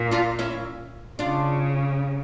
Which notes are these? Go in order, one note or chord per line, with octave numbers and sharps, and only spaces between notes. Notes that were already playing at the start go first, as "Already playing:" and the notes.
Already playing: A#2
D4 F4
C#4 E4
C#3 D4 F4